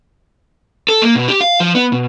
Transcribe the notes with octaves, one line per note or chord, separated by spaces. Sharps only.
A4
A#3
B2
G4
F5
F3
B3
B2